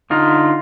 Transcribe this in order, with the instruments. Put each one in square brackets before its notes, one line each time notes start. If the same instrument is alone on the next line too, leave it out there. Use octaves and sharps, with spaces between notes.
[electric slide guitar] D3 D#4 F4